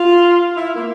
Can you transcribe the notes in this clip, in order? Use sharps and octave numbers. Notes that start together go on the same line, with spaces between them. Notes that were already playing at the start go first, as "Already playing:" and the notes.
Already playing: F4
E4
A#3